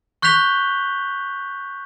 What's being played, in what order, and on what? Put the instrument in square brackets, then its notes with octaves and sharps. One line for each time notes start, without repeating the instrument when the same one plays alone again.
[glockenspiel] C#6 F#6 G6 B6 F7 G7